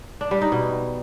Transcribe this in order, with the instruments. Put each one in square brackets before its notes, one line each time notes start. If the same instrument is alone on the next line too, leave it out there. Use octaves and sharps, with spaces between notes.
[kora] D4
G3
D#4
B2